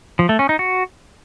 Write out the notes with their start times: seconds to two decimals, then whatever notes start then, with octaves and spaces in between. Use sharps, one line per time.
0.19 F3
0.29 A3
0.39 C#4
0.49 D#4
0.59 F#4